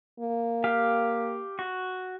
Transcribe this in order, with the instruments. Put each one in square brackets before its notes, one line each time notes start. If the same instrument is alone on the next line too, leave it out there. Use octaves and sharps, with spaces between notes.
[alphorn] A#3
[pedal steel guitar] G4 F5
F#4